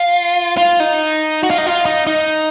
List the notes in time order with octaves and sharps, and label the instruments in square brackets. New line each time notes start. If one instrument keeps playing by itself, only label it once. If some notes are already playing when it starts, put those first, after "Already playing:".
Already playing: [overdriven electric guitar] F4
F4
D#4
F#4
F4
D#4
F4
D#4
D#4